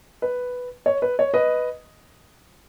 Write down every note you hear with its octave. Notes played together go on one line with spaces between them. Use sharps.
B4
C#5
B4
C#5
B4 D#5